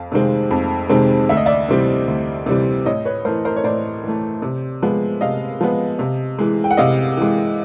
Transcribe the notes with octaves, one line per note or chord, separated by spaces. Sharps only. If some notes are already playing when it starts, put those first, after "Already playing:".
Already playing: F2 F5
C3 D#3 G#3 C4
F2
C3 D#3 G#3 C4
D2 E5
D#5
D5 E5
C3 E3 G3 C4
D2
C3 E3 G3 C4
A2 C#5 D#5
B4 C#5
E3 A3 A#4 C5
A#4 C5
C#5
A2 C5 D5
E3 A3
C3
F3 G#3 B3
C3 D#5 F5
F3 G#3 B3
C3
E3 G#3
G5
F#5
C3 D#5 F5
E3 G#3